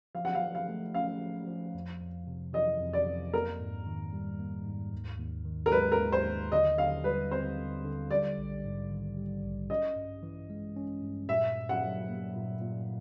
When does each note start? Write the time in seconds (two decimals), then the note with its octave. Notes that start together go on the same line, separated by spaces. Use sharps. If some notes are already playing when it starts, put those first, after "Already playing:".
0.15 F3 F5
0.25 F#5
0.35 F5
0.41 F3
0.55 F5
0.69 A3
0.94 C#4 F5
1.21 F3
1.47 F3
1.75 F2
2.01 F2
2.27 C3
2.53 E3 D#5
2.80 F2
2.93 D5
3.07 F2
3.33 A#3 A#4
3.60 G#2
3.87 D#3
4.13 G3
4.40 A#3
4.66 G#2
4.93 D#2
5.19 D#2
5.45 D#3
5.66 A#4
5.72 G#3 B4
5.92 A#4
5.99 D#2
6.12 C5
6.25 D#2
6.52 D3 D#5
6.78 D3 F5
7.04 G3 B4
7.31 C4 C5
7.58 D3
7.84 D3
8.11 G3 D5
8.37 A#1
8.64 G#2
8.91 D#3
9.17 G3
9.44 A#1
9.70 C#4 D#5
9.96 G2
10.23 E3
10.50 G#3
10.76 C#4
11.02 G2
11.29 A#2 E5
11.56 A#2
11.69 F#5
11.83 F#3
12.09 A#3
12.35 A#2
12.61 A#2